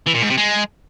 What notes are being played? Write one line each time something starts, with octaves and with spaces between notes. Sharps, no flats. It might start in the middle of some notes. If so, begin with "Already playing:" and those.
E3
A#2
G#2
C3
G#3